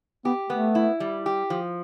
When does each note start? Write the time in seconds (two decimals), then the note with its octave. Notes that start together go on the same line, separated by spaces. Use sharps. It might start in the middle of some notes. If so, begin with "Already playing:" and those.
0.25 B3 G4
0.49 A3 B3
0.75 E4
1.00 G3
1.26 G4
1.50 F3